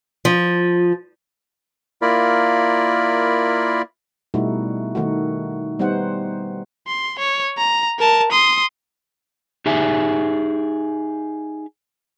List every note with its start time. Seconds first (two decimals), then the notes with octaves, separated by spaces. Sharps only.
0.25 F3
2.02 A#3 E4 F4 A#4 D5 B5
4.34 B2 G3 A3 D#4 E4 F#4
4.95 D#3 A3 D#4 F#4
5.79 G3 B3 D#4 C5 F#5
6.87 C6
7.19 C#5
7.58 A#5
7.99 A#4 A5
8.32 C6 D#6
9.66 D#4 G4 G#4 E5